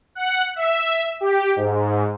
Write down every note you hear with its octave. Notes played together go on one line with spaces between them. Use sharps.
F#5
E5
G4
G#2